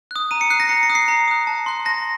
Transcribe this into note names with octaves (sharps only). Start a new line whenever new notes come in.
D#6 F#6
A#5 D#7
C#7
D#6 F#6 C7
A#6
A#5 C#7
C#7
D#6 F#6
C7
A#5 C7
D#6 F#6
A5
C6 F#6
A5 A#6